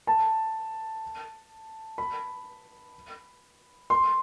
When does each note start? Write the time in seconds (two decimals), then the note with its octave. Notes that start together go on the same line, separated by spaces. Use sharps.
0.07 A5
1.98 B5
3.90 C6